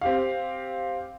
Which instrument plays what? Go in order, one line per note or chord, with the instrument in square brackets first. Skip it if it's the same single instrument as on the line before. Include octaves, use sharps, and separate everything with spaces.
[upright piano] C4 G4 F5